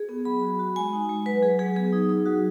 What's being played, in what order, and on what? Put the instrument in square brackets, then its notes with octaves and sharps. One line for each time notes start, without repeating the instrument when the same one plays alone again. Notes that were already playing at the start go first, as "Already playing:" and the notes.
Already playing: [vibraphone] G#4
B3
F#3 B5
F#4
F#4
G#3 G#5
D#4
G#3
F#3 B4
F#3 G#4
F#3 G#4
B3 G#4
D#4
D#4
F#3 F#4